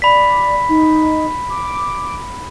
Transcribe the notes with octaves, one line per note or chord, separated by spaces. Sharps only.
D5 B5 B6
D#4
D6